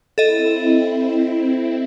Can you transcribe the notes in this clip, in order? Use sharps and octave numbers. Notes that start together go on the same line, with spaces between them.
C4 E4 A4 D#5